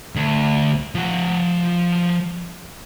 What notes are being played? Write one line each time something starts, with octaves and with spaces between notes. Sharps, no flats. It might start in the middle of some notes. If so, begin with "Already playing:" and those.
D2
F3 F#5